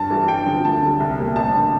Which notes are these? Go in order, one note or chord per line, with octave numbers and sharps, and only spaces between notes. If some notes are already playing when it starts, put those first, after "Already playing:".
Already playing: G2 A5
E3 G3
G2 G5
D3 F3
D2 A5
D3 G3
C2
A#2 G3 A#3
A1 A5
D3